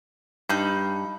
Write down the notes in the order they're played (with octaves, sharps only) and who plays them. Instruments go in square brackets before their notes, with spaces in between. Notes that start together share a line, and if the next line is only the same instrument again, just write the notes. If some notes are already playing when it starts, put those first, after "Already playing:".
[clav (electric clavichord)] G2 [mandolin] D#4 B5 G6